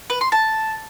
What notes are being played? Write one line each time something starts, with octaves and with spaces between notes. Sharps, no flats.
B4
C6
A5